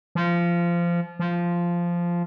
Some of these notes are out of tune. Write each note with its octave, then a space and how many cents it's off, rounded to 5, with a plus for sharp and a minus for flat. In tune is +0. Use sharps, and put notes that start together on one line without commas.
F3 -20
F3 -10